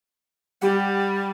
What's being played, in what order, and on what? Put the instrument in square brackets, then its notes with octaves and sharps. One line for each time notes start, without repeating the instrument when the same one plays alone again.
[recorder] G3 [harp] G4 F#5